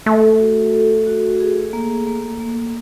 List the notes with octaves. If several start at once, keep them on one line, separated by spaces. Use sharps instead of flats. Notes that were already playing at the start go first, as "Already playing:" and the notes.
A3 A4
F#4
A4
F#4
G#4
A#3
A#3
A#3